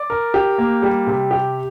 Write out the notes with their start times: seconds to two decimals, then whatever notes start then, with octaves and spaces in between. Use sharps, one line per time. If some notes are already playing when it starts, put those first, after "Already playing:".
Already playing: D5
0.10 A#4
0.34 G4
0.58 A#3
0.83 G3
1.07 C3
1.31 G4